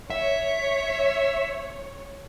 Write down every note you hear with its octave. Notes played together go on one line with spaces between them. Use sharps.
C#5 E5